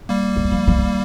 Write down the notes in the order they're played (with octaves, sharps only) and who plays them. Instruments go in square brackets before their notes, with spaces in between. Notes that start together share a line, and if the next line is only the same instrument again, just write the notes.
[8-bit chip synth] G3 A#3
[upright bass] F3
D#3
F3
F3
D#3